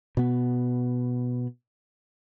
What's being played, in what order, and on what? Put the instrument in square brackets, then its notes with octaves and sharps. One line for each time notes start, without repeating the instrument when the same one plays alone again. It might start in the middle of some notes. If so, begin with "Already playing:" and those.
[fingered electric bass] B2 B3